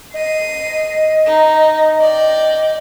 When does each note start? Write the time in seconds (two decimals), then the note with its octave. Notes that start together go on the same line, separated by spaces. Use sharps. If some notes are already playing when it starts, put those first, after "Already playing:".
0.14 D#5 C7 D#7
1.26 D#4
2.01 D5 G5